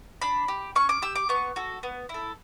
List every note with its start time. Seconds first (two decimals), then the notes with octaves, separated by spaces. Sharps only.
0.21 D4 B5
0.48 G4
0.75 C#4 C#6
0.89 D6
1.02 G4 E6
1.15 D6
1.29 B3 C#6
1.56 F#4 A4
1.83 B3
2.09 E4
2.14 A4